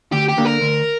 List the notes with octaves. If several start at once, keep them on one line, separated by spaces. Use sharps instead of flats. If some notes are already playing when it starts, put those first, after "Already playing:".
D2 G4
G4
D3 A#3
A#4
D2